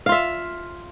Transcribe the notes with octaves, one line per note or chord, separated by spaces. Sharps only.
F4 E5 F5